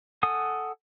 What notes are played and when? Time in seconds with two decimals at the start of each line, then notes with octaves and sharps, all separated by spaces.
0.23 A4 F#5 G#5 D#6